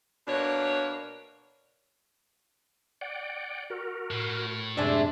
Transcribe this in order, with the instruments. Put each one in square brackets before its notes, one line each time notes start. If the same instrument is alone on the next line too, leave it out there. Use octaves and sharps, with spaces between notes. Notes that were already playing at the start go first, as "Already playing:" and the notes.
[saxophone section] B2 A#3 D4 C#5
[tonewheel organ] D5 F#5 G5
F#4 A#4
[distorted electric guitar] A2
[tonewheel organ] F#2 C3 [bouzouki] G#3 D5 E5 [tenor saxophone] D4